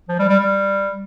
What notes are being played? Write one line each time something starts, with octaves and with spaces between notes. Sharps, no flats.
F3
G3
G3
G3